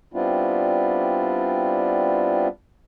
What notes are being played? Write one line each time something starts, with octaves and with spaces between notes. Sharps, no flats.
G3 B3 C4 D4 E4 F4